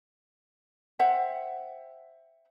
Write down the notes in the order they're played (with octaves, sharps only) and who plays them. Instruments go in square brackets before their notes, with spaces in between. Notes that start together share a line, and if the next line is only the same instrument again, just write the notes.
[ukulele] C5 E5 F#5 G5